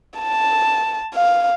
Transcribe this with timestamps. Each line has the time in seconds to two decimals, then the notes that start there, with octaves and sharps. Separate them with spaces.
0.19 A5
1.15 F5